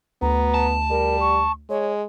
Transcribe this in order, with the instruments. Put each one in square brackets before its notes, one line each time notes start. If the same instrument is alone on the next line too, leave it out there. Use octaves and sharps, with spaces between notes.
[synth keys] D2 [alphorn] B3 [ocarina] A#5
[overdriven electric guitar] A5
[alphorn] G3 [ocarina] A#4
[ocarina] C#6
[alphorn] G#3 [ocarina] C#5